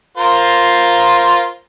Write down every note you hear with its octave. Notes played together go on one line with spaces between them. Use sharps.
F4 A#4 C5